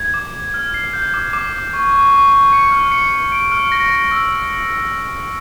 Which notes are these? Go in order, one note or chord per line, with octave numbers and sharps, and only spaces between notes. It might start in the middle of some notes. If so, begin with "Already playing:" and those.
Already playing: G#6
D6
D6
F6
C7
G6
D6
D6
D6
C#6
C#6
C#6
C#6
C#7
F6
C#7
C#7
D7
F6
A#6
A#6
E6